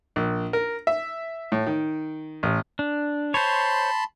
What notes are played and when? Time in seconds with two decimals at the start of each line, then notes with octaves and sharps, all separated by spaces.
0.16 A#1
0.53 A#4
0.87 E5
1.52 A2
1.67 D#3
2.43 A1
2.79 D4
3.34 C5 C#5 A5 B5 C6